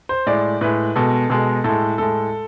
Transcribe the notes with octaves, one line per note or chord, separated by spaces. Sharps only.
C5
A2 G#3 D5
A2 G#3 B4
B2 G#3 A4
B2 G#3 A4
A2 G#3 A4
A2 G#3 A4